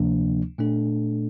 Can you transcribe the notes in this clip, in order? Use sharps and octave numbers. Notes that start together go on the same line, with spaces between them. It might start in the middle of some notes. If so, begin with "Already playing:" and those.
Already playing: D2 C3 F3 A#3 D4
A#2 A3 D4 A4